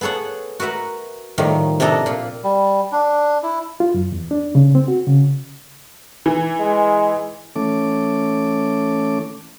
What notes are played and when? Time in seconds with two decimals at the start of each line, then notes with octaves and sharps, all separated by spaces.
0.01 B3 G#4 A4 C#5 F#5
0.60 F#4 A#4 B4 E5 F#5
1.38 A2 D#3 F3 G3
1.80 C3 C4 D4 A4 D#5 A#5
2.06 A#2 F4
2.44 G3
2.92 D4
3.43 E4
3.80 F4
3.94 F#2
4.12 E2
4.31 D4
4.55 C#3
4.75 C4
4.88 F#4
5.07 C#3
6.26 E3
6.59 G#3
7.56 E3 A3 C#4 A4 D6